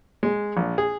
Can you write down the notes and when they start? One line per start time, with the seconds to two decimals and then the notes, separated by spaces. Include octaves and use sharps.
0.23 G#3
0.57 A#1
0.78 G#4